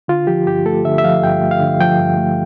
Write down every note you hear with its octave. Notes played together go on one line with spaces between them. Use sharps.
D3 F4
F3 G4
G2 G4
A3 A4
D3 E5
E5
F3 F5
G2 G5
A3
F5
D3
F3 G5
G2
A3